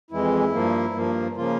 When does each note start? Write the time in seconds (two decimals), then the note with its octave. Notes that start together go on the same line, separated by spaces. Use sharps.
0.11 F2 E3 G#3 E4
0.52 G2 F3 A#3
0.94 G2 F3 A#3
1.36 C#3 F3 A#3 F4